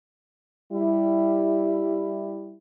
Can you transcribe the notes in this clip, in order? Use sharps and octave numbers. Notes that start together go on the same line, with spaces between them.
G3 E4